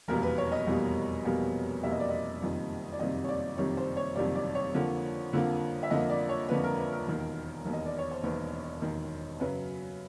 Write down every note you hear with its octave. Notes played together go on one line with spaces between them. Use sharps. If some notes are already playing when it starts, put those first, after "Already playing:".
F1 E2 B2 G3 A#3 A#4
B4
C#5
D#5
F1 E2 B2 G3 A#3
F1 E2 B2 G3 A#3
F1 E2 B2 G3 A#3 E5
D#5
D5
D#5
F#1 F2 C3 D#3 G3
D5
F#1 F2 C3 D#3 G3 D#5
C#5
D5
F#1 F2 C3 D#3 G3 C#5
C5
C#5
F#1 F2 C3 D#3 G3 D5
D5
C#5
F2 D3 F3 A#3
F2 D3 F3 A#3
E5
F2 D3 F3 A#3 D#5
D5
C#5
F2 D3 F3 A#3 B4
A#4
B4
A#4
E1 D#2 D#3
E1 D#2 D#3
D#5
D5
C#5
C5
E1 D#2 D#3 B4
E1 D#2 D#3
F#2 C#3 F#3 B4